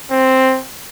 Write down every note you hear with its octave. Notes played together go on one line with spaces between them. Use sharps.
C4